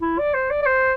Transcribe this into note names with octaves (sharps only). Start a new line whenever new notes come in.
E4
D5
C5
D5
D5
C5